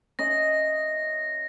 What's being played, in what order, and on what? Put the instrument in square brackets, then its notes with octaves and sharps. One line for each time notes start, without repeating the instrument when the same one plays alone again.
[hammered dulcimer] C#4 D#5 E5 [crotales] A#6